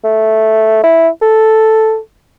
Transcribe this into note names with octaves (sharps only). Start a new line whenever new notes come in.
A3
E4
A4